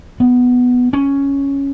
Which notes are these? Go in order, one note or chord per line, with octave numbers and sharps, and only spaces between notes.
B3
C#4